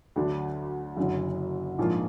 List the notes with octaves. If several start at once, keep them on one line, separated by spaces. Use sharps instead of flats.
D2 D3 F#3 D4
F#1 F#2 D3 F#3
A#1 G#2 F3 A#3 F4